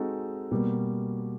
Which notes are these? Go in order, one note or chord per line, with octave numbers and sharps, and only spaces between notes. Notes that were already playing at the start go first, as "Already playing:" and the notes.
Already playing: G#3 C4 D#4 F#4 A4
B2 G3 A#3